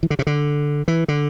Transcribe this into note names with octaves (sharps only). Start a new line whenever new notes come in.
E3
D3
C3
D3
E3
D3